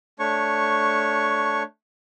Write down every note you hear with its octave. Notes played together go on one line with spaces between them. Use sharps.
A3 D4 C#5 C#6